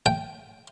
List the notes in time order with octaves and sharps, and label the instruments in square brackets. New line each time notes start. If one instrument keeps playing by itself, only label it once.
[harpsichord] G5